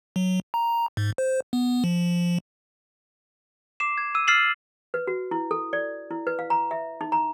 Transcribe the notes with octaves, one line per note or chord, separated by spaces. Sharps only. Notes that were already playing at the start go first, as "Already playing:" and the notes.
F#3
A#5
G#2
C5
B3
F3
D6 C7 E7
G#6
E6 D#7
E6 F6 A6 C7 E7 F#7
B4
F#4
E4
A4
D5
E4
B4
F5
A#5
E5
D#4
A#5